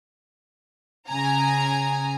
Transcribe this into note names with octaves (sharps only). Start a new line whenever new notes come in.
C#3 G#5 A#5